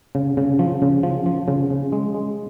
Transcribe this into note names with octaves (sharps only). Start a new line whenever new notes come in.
C#3
C#3
F3
C#3
F3
F3
C#3
C#3
G#3
G#3